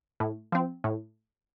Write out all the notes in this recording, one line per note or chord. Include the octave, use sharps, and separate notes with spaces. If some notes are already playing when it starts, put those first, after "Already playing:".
A2
F3 C4
A2